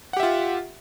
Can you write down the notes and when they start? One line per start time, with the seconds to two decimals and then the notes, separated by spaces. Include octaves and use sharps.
0.13 F#5
0.17 G4
0.20 E5
0.23 F4